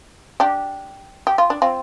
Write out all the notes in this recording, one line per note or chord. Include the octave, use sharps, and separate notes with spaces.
D4 G4
G4
F4
D4
C4 F4